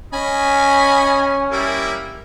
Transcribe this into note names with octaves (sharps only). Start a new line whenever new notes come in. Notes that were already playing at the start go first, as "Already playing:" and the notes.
C#4 D#5 G#5 B5
G3 A#3 E4